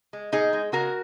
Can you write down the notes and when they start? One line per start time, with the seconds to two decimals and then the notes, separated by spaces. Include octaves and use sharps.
0.13 G#3
0.32 A#2 D#4 G#4
0.53 G#3
0.72 C#3 F#4 A#4